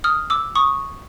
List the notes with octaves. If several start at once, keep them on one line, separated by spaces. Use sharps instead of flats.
D#6 F6
D6 E6
C#6 D#6